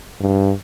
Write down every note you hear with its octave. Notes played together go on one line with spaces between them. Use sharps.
G2